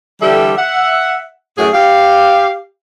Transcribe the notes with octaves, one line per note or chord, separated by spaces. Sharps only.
D3 E3 G3 G4 A4 E5
E5 F#5
F#2 A2 F#4 G#4
G4 F5